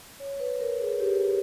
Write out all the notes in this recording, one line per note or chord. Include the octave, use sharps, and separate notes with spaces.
C#5
B4
A#4
G#4
G4